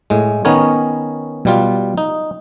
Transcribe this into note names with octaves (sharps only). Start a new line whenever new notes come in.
A2 G#3
D#3 B3 C#4 D#4 A#4 C#5
B2 G3 F4
D#4